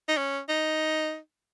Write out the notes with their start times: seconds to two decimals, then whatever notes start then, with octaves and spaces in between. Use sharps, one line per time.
0.08 D#4
0.17 C#4
0.49 D#4